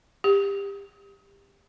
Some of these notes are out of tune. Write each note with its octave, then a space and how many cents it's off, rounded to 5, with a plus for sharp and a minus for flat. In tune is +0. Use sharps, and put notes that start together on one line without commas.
G4 +25